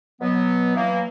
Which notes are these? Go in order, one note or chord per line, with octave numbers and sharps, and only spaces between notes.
B2 F#3 B3
E3 F#3 A#3